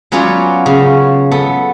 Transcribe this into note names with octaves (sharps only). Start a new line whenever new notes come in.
F#3 B3 C#4 F4 C#5 D5
C#3
B3 A4